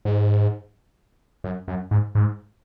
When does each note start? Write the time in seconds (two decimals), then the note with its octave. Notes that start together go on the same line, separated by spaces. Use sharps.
0.05 G#2
1.44 F#2
1.68 F#2
1.91 G#2
2.15 G#2